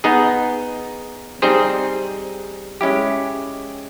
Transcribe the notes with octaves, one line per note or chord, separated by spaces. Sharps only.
B3 D#4 G#4
G3 C4 D#4 G#4 C5
G#3 C#4 E4 G4